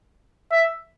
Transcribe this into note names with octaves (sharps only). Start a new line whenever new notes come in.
E5